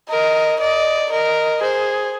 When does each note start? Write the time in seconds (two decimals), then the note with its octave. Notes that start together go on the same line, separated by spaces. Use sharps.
0.10 A#4 D#5
0.60 D5 D#5
1.11 A#4 D#5
1.61 G#4 C5